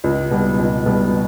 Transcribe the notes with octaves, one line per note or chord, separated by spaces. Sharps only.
C#2
B2 G3
C#2
B2 G3